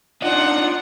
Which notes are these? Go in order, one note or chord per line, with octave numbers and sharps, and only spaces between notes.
D4 D#4 F4 F#5